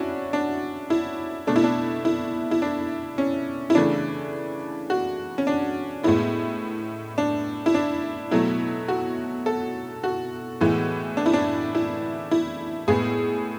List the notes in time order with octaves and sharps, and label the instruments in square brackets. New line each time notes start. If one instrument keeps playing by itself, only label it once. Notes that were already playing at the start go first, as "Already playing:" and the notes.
Already playing: [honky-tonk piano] C#4 D4 E4 F#4
D4
E4
B2 A3 D4
E4
D4
E4
E4
D4
C#4
E4
C#3 E3 A3 D4
F#4
C#4
D4
A2 G#3 B3 E4
D4
E4
D4
B2 F#3 A3 E4
F#4
A4
F#4
A2 E3 G#3 B3
D4
E4
D4
E4
E4
A2 G#3 B3 G#4